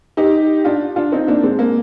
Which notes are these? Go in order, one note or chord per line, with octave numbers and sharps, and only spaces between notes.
D#4 G4
D4 F4
D4 F4
C4 D#4
A#3 D4
G#3 C4
A#3